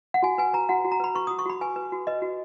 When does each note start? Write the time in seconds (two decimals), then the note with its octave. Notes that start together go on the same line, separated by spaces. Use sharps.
0.14 F#5
0.23 F#4 G#5
0.38 B4 G#5
0.53 B4 A#5
0.69 F#4 F#5
0.85 F#4
0.92 A#5
1.00 B4 B5
1.15 B4 C#6
1.27 D#6
1.31 F#4
1.39 C#6
1.46 F#4 B5
1.61 B4 G#5
1.76 B4
1.92 F#4
2.07 B4 D#5
2.22 F#4